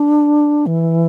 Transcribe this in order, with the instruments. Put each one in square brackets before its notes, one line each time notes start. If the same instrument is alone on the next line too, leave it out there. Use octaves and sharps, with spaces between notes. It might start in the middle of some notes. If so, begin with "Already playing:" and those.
Already playing: [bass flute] D4
E3